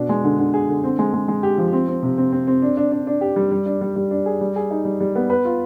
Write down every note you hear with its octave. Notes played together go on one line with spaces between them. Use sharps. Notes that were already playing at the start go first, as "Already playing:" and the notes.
Already playing: B2 D4
G#3
D3
D3
G#4
D3
C4
G#3
G#3
G#3
G4
F3
C4
C4
C3
C4
C4
C4
D4
D4
D4
D4
G4
G3
G3
D4
G3
G3
D4
G#4
G3
G#4
D#4
G3
G3
B3
B4
F4